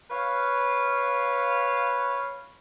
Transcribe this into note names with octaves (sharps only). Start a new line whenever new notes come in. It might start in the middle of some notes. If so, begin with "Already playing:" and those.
B4 C#5 F5